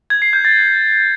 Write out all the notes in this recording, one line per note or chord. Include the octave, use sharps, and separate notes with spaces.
G#6
C7
G6
A6